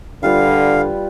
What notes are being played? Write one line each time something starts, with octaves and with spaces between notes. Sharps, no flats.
D3 G3 F4 B4 F5